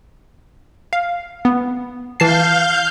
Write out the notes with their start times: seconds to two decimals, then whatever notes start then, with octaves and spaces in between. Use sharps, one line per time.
0.93 F5
1.45 B3
2.20 E3 F5 A5 F6 G6 C7